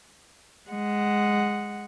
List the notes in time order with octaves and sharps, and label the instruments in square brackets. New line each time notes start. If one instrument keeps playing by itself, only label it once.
[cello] G#3 F#5